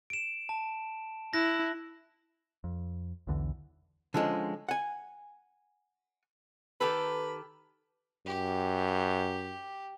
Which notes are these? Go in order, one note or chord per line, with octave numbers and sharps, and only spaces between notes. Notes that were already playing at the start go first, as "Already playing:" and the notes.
D7 E7
A5
E4 F#6 A#6
F2
B1 E2 D3 E3
D3 F3 G#3 C#4
F#5 G#5
D#3 G4 A4 B4
F#2 G4